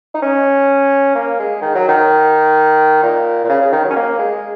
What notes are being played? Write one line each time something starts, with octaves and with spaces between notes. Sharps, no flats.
D#4
C#4
A#3
G#3
D#3
F#3
D#3
A#2
A#2
C#3
C#3
D#3
F#3
C#4
A#3
G#3